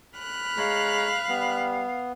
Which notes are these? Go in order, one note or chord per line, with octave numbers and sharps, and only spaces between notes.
B5 F6 F#6
G#3 C#5 F5 A#5
G3 B3